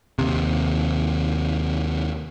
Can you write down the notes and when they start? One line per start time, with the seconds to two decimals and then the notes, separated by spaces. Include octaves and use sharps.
0.19 D#2 C3